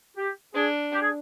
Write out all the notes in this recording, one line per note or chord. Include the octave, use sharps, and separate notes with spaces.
G4
D4 G#4
G4
G#4